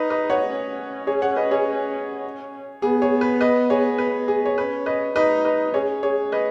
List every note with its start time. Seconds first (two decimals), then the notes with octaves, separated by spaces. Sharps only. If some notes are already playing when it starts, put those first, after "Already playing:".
Already playing: D#4 B4 D#5
0.10 B4 D#5
0.30 C#5 F#5
0.49 C#4
1.07 G#4 C#5
1.22 C#5 F#5
1.36 B4 D#5
1.51 G#4 C#5
2.82 B3 G#4
3.02 G#4 C#5
3.21 B4
3.41 B4 D#5
3.70 G#4 C#5
3.98 B4
4.28 G#4
4.46 C#5
4.58 C#4 B4
4.86 B4 D#5
5.15 D#4 B4 D#5
5.45 B4 D#5
5.74 C#4 G#4 C#5
6.03 G#4 C#5
6.32 B4 D#5